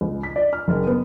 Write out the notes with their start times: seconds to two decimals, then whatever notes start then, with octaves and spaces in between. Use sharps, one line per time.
0.01 C#2
0.23 B6
0.36 D5
0.53 F6
0.68 F#1
0.87 B3